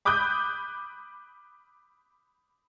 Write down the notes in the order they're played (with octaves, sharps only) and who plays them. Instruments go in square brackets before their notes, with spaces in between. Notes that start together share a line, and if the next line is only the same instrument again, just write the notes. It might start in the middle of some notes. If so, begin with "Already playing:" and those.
[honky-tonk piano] B5 D6 D#6 F#6 G6